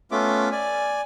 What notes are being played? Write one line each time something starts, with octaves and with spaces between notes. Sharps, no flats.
A3 B3 C#4 F4 E5 D6
D5 G#5